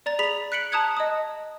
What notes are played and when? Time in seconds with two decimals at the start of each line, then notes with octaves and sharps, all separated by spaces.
0.06 D5 A#5 A6
0.19 G#4 B5 B6 F7
0.52 F#6 B6 C#7 D7 F#7
0.72 A5 A#5 D#6 F#6 G#6 C#7
0.97 D#5 D#6